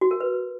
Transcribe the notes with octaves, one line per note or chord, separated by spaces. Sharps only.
F#4
A#4
B4